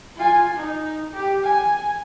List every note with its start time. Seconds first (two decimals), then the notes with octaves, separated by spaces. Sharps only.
0.16 F4 G#5
0.56 D#4
1.13 G4
1.43 G#5